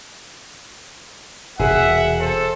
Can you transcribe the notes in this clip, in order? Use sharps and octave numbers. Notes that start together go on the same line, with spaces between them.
E1 E2 C3 G#4 E5 F#5
A4 C5